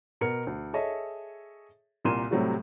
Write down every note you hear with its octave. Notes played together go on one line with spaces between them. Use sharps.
B2 A#4 C#7
D2
G#4 A4 C#5 D#5 E5
C2 A#2 A#4 C6 D#7 E7
A2 C3 F#3 G3 A3 F#4